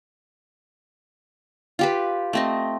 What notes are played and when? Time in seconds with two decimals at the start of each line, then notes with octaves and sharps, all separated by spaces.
1.79 F4 G4 B4
2.33 A3 C4 D#5